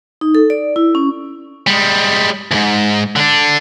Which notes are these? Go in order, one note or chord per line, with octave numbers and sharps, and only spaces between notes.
D#4
A4
D5
E4
C#4
G3 G#3
D2 G#2
D3 D4